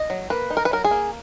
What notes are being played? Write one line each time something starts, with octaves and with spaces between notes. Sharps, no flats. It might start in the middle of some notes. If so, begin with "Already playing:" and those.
Already playing: D#5
F#3
A#3 B4
D#4
A#4
B4
F#3 A#4
G#4
A#3